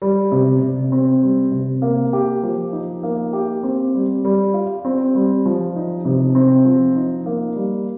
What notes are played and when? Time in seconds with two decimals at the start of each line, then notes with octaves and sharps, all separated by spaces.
0.02 G3
0.32 C3
0.61 C3
0.92 C4
1.22 G3
1.51 C3
1.82 A#3
2.13 G4
2.43 F3
2.72 D#4
3.03 A#3
3.33 G4
3.63 C4
3.94 G3
4.25 G3
4.54 F4
4.85 C4
5.15 G3
5.46 F3
5.76 D#4
6.05 C3
6.35 C4
6.65 F3
6.96 D#4
7.26 A#3
7.56 G3